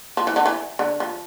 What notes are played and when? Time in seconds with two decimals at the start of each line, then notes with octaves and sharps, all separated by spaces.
0.17 F3
0.27 E3
0.36 D3
0.46 E3
0.79 D3
1.00 F3